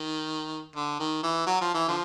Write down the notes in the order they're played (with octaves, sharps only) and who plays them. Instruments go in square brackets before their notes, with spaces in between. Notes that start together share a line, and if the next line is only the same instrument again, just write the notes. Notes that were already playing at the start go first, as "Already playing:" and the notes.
Already playing: [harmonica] D#3
D3
D#3
E3
F#3
F3
E3
D3 F3